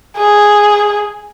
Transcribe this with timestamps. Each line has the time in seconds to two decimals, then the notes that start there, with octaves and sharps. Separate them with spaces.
0.17 G#4